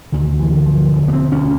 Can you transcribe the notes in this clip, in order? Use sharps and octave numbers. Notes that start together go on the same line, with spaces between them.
D2 D#3
E3
D3
F3
E1
B3
C4
D2 C#4